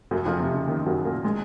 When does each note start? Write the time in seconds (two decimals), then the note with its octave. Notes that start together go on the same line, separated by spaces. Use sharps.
0.11 F#2 F#3
0.25 F2 F3
0.40 C3
0.54 C#3
0.67 D#2 D#3
0.86 F#2 F#3
1.05 A#2 A#3
1.24 G#3